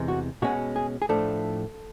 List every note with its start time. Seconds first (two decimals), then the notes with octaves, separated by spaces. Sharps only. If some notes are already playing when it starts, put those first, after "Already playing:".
Already playing: E2 C3 E3 G#3
0.08 F#4
0.42 B2 G#3 C#4 F#4
0.76 G#4
1.02 G#4
1.09 A2 F3 A3 D4 A4